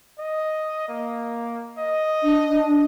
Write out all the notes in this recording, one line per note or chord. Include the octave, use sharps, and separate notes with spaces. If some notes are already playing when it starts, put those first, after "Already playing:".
D#5
A#3
D#5
D4